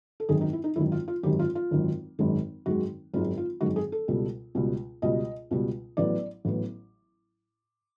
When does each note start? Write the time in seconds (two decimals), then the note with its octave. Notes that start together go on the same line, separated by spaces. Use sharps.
0.20 A4
0.29 G#1 F#2 D#3 G#4
0.41 D#4
0.53 E4
0.64 D#4
0.76 G#1 F#2 D#3 E4
0.92 F4
1.08 F4
1.23 G#1 F#2 D#3 G4
1.39 F4
1.55 F4
1.71 G#1 F#2 D#3
2.19 G#1 F#2 D#3 G#3
2.66 G#1 F#2 D#3 G#3 F#4
3.14 G#1 F#2 D#3 G#3 F4
3.37 F4
3.61 G#1 F#2 D#3 G#3 F#4
3.76 G#4
3.92 A4
4.08 C#2 B2 G3
4.55 C#2 B2 G3
5.02 C#2 B2 G3 D#5
5.51 C#2 B2 G3
5.97 A1 A2 F#3 B3 D5
6.45 A1 A2 F#3 B3